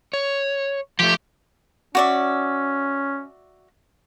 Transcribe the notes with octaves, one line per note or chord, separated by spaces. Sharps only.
C#5
F3 A3 G4
C#4 F#4 D5 E5